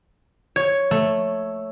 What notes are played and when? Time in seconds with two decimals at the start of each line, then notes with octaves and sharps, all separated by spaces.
0.56 C#5
0.91 A3